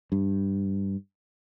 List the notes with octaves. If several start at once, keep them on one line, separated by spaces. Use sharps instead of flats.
G2